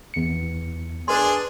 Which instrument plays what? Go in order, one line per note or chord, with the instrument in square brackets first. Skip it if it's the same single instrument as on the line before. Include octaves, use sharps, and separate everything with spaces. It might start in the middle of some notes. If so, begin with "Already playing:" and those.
[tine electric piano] E2 C#7
[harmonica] D4 G#4 [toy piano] B4 C6